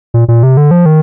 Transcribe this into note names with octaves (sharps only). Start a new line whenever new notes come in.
A#2
A#2
C3
D3
F3
D#3